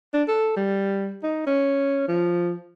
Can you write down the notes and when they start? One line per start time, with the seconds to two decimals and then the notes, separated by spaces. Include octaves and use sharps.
0.14 D4
0.28 A4
0.56 G3
1.23 D#4
1.47 C#4
2.08 F3